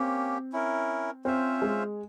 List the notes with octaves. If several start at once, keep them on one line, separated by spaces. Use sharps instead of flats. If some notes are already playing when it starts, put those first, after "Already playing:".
Already playing: A#3 C4 C#4 G4
C#4 E4 A#4
C4 C#4 F4 C5 E5
G#3